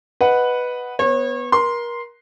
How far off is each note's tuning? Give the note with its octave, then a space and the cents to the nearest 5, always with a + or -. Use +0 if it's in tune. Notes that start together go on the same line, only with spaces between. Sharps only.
B4 +0 D#5 +0 F#5 +0
B3 +0 C#5 -35
A#4 +30 C6 +0